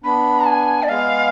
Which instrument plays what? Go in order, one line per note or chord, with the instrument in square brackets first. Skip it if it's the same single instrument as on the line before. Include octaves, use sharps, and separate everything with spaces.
[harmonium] B3 D4 [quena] B5
[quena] G#5
D5
[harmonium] G#3 B3 [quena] F5